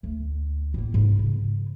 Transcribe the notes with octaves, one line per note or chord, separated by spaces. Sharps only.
D2
A1 A#3
G#2
C#3